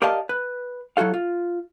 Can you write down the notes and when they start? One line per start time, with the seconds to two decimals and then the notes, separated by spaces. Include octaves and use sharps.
0.02 G4 A#4 D5 D#5 F5 A5
0.29 B4
0.97 F#3 E4 F#4 A4 F5
1.14 F4